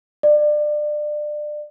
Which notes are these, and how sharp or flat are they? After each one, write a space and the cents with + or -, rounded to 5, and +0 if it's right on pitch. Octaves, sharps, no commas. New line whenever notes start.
D5 +25